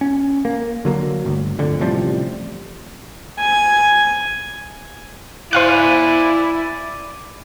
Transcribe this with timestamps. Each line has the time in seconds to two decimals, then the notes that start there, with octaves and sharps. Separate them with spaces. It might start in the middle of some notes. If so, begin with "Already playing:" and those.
0.01 C#4
0.45 A#3
0.85 D3 F#3 A#3
1.25 G1 D2
1.59 G1 F2 D3
1.80 A1 C3 F3 G3
3.39 G#5
5.53 E4 C5 D5 F5 G#5 F#6